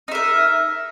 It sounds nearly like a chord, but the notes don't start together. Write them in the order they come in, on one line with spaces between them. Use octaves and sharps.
D#4 E5 A#4